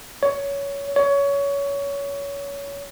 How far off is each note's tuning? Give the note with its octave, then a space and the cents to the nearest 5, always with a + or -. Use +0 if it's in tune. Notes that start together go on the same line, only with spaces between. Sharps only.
C#5 +15
C#5 +20